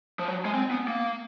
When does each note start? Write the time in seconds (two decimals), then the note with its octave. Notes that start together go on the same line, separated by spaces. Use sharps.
0.19 F3
0.28 F#3
0.45 G#3
0.54 C4
0.71 B3
0.88 A#3